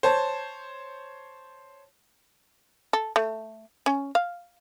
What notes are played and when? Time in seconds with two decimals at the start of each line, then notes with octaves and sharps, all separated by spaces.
0.03 C5 C#5 A5
2.93 A4
3.16 A3
3.86 C#4
4.15 F5